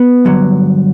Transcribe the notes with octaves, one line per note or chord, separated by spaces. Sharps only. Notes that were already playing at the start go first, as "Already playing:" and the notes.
Already playing: B3
G2 D3 F#3